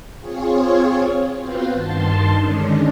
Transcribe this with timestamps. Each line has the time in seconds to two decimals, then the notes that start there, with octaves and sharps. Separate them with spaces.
0.19 C4 F4 G#4 C#5
1.39 B3 C4 F4 F#4 B4 C5
1.72 G2 D#3 A5 C6
2.38 D3 D#3 G#3 C#4 D4